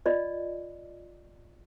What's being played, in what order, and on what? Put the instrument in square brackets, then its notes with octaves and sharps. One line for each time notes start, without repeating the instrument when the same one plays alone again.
[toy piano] F4 D5 D#5